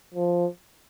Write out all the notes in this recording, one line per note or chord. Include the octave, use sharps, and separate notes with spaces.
F3